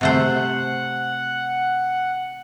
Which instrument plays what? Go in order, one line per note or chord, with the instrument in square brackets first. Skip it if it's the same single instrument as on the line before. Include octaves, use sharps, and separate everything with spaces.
[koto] C3 A3 C5 [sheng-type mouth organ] F#5